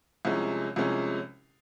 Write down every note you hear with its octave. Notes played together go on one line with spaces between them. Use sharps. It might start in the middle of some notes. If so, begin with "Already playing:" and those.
C2 C3 F3 G#3 C#4
C2 C3 F3 G#3 C#4